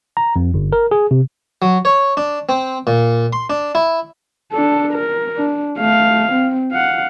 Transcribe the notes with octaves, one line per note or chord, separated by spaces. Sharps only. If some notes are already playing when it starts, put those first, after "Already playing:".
A#5
F2
G1
A#4
G#4
C3
F#3
C#5
D4
C4
A#2
C6
D4
E4
D4 A4
A#4
D4
A3 F5
C4
F5 F#5